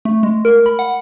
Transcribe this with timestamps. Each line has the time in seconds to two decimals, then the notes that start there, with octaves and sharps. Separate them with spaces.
0.05 A3
0.23 G#3
0.45 A#4
0.66 B5
0.79 F#5